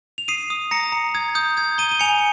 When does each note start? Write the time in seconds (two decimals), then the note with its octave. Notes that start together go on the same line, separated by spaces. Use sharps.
0.18 F7
0.28 D#6 C7 D#7
0.50 D#6
0.71 A#5 A#6 C#7
0.92 A#5
1.15 D#6 G#6
1.35 D#6 G6
1.57 D#6 G#6
1.78 A#5 D#7 G7
1.91 D#7
2.00 G#5 C#7 F7